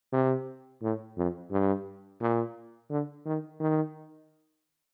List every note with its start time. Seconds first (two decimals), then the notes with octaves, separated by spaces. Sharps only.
0.13 C3
0.82 A2
1.17 F2
1.51 G2
2.21 A#2
2.90 D3
3.26 D#3
3.60 D#3